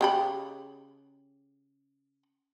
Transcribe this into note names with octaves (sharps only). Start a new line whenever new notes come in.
C#3 G4 B5